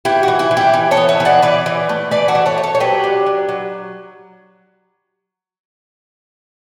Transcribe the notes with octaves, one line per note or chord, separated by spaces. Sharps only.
E3 E4 G4
F#4
E3
E4
E3
E4 G4
E3
A4 C#5
B3
C#5 E5
E3
D5 F#5
E3 B4 D5
E3
A3
E3 B4 D5
F#4 A4
E3
A4 C#5
A3
A4 C#5
C#5
F#3 G4 B4
D4
F#3
F#3